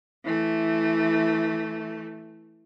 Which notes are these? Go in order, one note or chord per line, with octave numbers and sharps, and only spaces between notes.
E3 A3